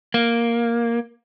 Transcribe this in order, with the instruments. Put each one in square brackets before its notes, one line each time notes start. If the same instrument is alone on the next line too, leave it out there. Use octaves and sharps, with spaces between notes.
[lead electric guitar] A#3